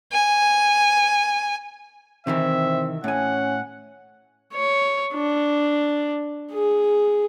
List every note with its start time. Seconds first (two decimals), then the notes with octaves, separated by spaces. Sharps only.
0.11 G#5
2.27 C3 D#3 E3 C4 E5
3.04 A2 C#4 F#5 G#5
4.53 C#5
5.13 D4
6.53 G#4